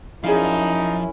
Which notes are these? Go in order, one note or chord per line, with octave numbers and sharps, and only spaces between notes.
F#2 F3 C#4 D#4 E4 G#4 D5 F5